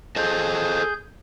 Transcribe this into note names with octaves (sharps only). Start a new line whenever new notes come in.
G#4 A4 C5 D#5 G6